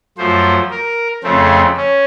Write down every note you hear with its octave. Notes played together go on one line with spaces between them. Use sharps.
F#2 F3 A3 C5
A#4
F2 C#3 A3 C4
C#4